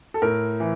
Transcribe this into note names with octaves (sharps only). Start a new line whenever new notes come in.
A4
A2 A#4
E3